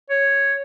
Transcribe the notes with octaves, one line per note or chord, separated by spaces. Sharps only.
C#5